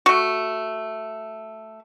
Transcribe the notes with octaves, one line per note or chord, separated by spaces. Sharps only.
A3 F#4